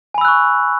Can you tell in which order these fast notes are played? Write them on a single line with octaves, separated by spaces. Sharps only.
G#5 B5 E6 F#6 C#6